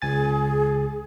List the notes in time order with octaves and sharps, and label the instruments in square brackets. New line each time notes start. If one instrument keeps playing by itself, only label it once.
[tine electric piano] C#2 G#5 A6 [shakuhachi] G#4